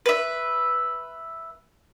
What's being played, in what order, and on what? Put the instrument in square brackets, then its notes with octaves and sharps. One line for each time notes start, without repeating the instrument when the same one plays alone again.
[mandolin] B4 E5